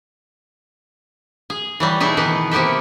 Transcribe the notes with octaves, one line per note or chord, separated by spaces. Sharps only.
G#4
E3 F#3 G3
B2 D#4 E4 G#4 E5
D#3 E3 B3
C3 A#3 B3 G4 E5